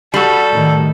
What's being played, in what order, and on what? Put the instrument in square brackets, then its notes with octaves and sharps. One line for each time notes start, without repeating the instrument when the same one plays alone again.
[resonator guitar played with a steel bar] G3 F#4 [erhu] A4
[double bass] A2 D#3